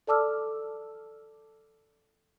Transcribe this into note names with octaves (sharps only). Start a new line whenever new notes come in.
A4 D5 A5 D6 E6 F6